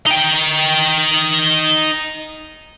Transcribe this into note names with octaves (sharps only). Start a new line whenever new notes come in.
D#4 G5